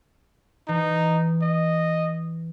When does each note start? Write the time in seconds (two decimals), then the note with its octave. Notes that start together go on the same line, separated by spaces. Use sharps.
0.68 E3 D#4
1.41 D#5